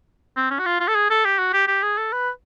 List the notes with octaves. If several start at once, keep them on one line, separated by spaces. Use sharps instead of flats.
C4
C#4
F#4
F4
F4
A4
G#4
A4
G4
F#4
G4
G4
G#4
A4
B4